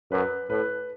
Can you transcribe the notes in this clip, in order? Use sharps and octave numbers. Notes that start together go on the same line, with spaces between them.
F#2 B4
A2 B4